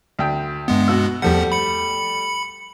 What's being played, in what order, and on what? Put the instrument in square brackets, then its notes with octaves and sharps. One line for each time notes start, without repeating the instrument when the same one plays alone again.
[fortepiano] D2 G5
[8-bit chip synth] G2 G#3 B3
[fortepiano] B2 F#4 E6
[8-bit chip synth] E2 F3 F#5 [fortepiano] G3 A3 G4
[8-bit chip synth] B5 C#7